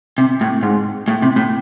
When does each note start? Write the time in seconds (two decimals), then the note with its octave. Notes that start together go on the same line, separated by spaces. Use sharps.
0.18 C3
0.41 A2
0.63 G#2
1.08 A2
1.22 C3
1.36 A2